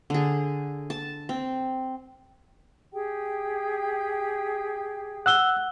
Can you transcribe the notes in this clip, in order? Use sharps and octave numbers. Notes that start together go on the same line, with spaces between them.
D3 G#4
A5
C4
G4 G#4 G5
F#5 E6 F#6 G7